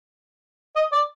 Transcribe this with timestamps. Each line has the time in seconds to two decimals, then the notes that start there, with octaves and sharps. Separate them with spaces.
0.75 D#5
0.92 D5